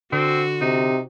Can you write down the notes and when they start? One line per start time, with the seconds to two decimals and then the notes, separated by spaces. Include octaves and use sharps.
0.12 D3 C4 F#4
0.62 C3 D#4